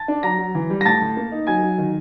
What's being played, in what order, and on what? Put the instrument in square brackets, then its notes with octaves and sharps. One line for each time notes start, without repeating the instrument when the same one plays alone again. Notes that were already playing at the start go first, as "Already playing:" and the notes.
Already playing: [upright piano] A5 A6
D4
F#3 A#5 A#6
F#3
E3
G3
A#6
A2 A5 A6
A2
A#3
D#4
F#3 G#5 G#6
F#3
D#3